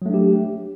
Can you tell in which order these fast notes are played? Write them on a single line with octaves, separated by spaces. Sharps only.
F#3 A3 D4 G4